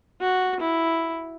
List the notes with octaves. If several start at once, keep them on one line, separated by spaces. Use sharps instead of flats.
F#4
E4